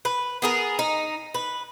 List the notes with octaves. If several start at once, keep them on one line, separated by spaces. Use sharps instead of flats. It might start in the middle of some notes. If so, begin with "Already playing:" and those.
B4
B3 G#4 A#4
D#4
B4